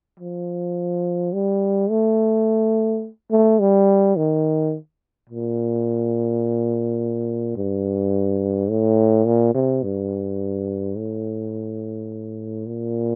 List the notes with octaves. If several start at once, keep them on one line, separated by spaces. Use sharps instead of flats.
F3
G3
A3
A3
G3
D#3
A#2
G2
A2
A#2
C3
G2
A2
A#2